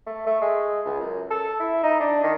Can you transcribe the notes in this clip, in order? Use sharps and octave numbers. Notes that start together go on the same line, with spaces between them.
A3
A3
G#3
C#2
F#2
A4
E4
D#4
D4
D#3